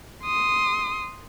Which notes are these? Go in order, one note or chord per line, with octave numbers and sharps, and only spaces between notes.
C6 D#6